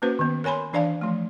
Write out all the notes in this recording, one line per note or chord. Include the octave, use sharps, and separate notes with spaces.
A#3 C#4 F#4 B4 C5
D#3 B3
A#4 C#5 G#5 B5 C6
E3 D4 D5 F5 A5
F3 A3